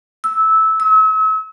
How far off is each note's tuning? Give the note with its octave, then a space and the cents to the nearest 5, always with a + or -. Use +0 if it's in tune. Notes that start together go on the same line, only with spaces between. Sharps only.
E6 -15
E6 -40